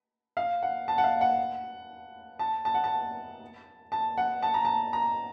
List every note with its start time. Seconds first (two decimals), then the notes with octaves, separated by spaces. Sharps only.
0.37 F5
0.63 F#5
0.88 A5
0.98 F#5
1.04 F5
1.21 F#5
2.39 A5
2.65 A5
2.74 F#5
2.84 A5
3.92 A5
4.17 F#5
4.43 A5
4.54 A#5
4.65 A5
4.93 A#5